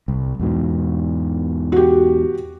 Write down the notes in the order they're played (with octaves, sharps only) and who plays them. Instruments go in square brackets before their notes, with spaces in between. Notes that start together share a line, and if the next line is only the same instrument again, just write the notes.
[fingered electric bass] C2
E2 G#2 B2
[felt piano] F#4 G4